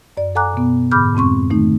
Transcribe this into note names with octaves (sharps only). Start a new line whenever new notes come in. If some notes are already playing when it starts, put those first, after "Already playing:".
F#2 D5
A4 F#5 G#5 A#5 D6 F#6
B2 B3
G#2 D3 B5 D6 F6 G6
F2 G#3 C4 C6 C#6
D#3 A3 D#4